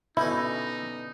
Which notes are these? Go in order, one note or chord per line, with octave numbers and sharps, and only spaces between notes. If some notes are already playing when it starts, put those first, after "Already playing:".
B2 D3 C#4 D#4 E4